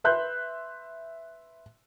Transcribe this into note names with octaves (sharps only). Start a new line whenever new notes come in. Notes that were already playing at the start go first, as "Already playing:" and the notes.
B4 E5 C6 F#6 G6